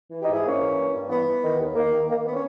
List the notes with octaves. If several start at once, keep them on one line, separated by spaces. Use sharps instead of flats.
E3
D#4 G4
G#2
E4 G#4
G#2 A#3 C#4
E3
G2
G2
E3 B3
E3
D#3
D#2
D#3 A#3
D#3
D#3 A#3
B3
C#4